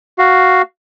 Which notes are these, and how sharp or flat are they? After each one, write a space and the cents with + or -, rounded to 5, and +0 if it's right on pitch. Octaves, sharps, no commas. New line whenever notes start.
F#4 +0 F5 +0